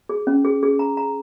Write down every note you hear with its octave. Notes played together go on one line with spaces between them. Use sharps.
G#4
C#4
G#4
G#4
A#5
A#5